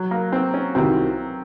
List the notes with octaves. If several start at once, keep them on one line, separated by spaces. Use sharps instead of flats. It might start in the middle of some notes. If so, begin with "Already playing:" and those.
Already playing: F#3
A#3
C4
C#4
C2 C3 D#3 F#3 C4